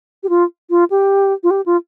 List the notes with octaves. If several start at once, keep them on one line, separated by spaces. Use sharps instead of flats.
G4
F4
F4
G4
F4
G4
F4